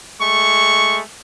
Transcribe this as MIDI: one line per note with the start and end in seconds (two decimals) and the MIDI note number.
0.21 1.01 56
0.21 1.01 57
0.21 1.01 85